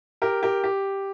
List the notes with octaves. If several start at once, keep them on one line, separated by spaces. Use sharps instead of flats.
G4 A#4
G4 A#4
G4